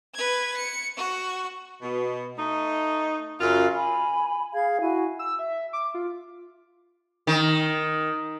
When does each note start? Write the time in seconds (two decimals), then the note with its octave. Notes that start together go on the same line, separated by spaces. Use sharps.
0.15 B4 G#6
0.57 C#7
0.97 F#4 C#6
1.82 B2
2.38 A3 D#4
3.40 F#2 C#3 F4 F5
3.76 G#5 B5
4.53 G#4 F5 G#6
4.80 E4 F#4 G#5
5.19 E6
5.39 E5
5.73 D6
5.94 F4
7.27 D#3